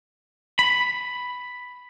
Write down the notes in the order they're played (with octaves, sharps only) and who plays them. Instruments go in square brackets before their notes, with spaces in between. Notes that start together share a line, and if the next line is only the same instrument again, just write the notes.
[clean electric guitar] B5